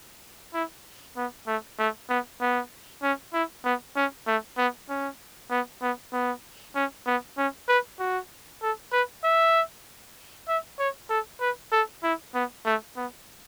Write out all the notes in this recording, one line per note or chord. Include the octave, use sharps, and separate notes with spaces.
E4
B3
A3
A3
B3
B3
C#4
E4
B3
C#4
A3
B3
C#4
B3
B3
B3
C#4
B3
C#4
B4
F#4
A4
B4
E5
E5
C#5
A4
B4
A4
E4
B3
A3
B3